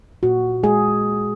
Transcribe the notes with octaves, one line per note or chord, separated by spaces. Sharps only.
A#2 F#4
G#3 G#4